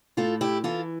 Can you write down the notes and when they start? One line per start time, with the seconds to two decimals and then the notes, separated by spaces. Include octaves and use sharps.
0.17 A2 F4 A4
0.41 E4 G4
0.64 E3 F4 A4